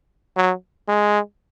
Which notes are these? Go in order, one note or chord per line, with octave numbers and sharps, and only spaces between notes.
F#3
G#3